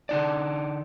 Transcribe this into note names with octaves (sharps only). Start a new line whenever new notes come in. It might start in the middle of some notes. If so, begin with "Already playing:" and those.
D3 D#4 D5